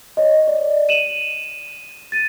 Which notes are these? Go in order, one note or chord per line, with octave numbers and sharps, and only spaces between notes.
C#5 D#5
D5
D#7 E7 F#7
A6 D#7